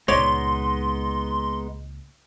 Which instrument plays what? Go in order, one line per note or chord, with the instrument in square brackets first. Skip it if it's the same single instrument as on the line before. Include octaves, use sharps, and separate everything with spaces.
[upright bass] C#2 A#2 [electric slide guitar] G#3 B3 D#4 [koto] C#5 D5 [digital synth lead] C6